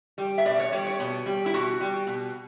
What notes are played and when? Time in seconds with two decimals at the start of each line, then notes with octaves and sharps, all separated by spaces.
0.18 G3
0.38 E5
0.45 B2 D5
0.60 C#5
0.72 G3 C#5
0.87 C#5
1.00 B2
1.26 G3
1.46 E4
1.54 B2 F#4
1.81 G3
2.07 B2